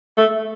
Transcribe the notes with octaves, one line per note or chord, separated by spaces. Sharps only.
A3